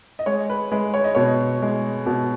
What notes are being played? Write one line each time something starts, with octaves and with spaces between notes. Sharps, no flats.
D#5
G#3 C#5
B4
G#3 B4
C#5
D#5
B2 C#5
G#3
B2